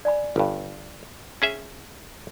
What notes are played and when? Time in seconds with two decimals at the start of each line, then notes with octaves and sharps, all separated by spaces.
0.05 D5 G#5 B5
0.36 G1 G2
1.42 C#4 G#4 E5